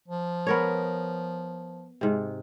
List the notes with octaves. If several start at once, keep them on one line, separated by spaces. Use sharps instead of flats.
F3
B3 A#4 C#5
G#2 C3